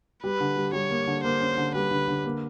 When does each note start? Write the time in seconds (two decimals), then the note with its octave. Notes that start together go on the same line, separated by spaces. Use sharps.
0.24 G3 B4
0.40 D3
0.57 G3
0.73 G3 C#5
0.90 A#3
1.07 D3
1.23 A#3 C5
1.41 C#4
1.58 D3
1.75 G3 B4
1.91 D3
2.08 D3
2.25 A#3